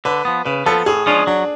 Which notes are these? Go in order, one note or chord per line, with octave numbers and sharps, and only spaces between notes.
D3 B4
F3 B3
C#3 B4
F3 B3 A4
A2 G#4
F3 G#3 C#4 D4 F4
F#3 D4